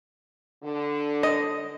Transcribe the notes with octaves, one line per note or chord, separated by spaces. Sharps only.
D3
D#5